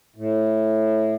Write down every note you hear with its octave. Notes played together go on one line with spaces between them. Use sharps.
A2